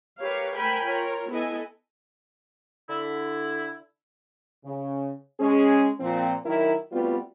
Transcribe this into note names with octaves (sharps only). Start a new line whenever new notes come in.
G4 A#4 B4 C#5 F5
A3 A#4 C5 G5 G#5 B5
F4 A#4 C#5
B3 E4 A4 D#5 G#5
D3 E4
C#3
G#3 C#4 G#4
A#2 F3 C4
D#3 F#3 E4 A#4
G3 A3 B3 C4 F4 F#4